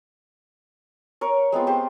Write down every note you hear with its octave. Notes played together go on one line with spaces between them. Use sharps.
A#4 C#5
G#3 B3 C4 F4
G4 C5